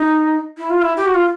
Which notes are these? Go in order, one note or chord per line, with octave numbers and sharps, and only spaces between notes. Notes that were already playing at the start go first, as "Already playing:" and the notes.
Already playing: D#4
E4
F4
E4
G4
F#4
F4